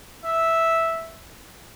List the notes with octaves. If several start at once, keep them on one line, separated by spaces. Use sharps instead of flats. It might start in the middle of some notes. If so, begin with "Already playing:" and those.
E5